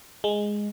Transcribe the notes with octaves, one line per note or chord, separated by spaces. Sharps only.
G#3